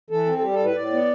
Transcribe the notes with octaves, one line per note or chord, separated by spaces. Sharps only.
E3 A4
C4
A4
G3 G4
A4
A2
B4
A2 D5
B3